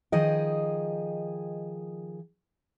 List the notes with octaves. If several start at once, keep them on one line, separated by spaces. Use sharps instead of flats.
D#3 F3 G#4 D#5 G5